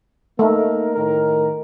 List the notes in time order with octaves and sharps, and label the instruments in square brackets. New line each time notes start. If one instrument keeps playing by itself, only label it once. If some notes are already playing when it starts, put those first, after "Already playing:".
[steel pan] A3 [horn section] A#3 D#4 A#4
[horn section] A2 D#3 A#4